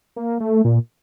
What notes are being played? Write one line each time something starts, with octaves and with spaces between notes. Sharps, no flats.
A#3
A3
A#2